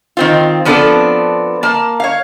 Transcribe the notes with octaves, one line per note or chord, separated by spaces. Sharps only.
D#3 C4 F4
F3 B3 C4 D4 A4 B4
A#3 A5
C#5 F5